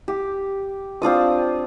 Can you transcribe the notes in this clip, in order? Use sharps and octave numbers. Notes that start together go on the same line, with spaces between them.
G4
C4 D4 F4 D#6